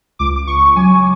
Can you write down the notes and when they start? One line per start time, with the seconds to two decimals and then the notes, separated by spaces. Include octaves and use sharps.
0.19 C#2 D6
0.36 D6
0.47 C#2 C#6
0.76 F#3 G#5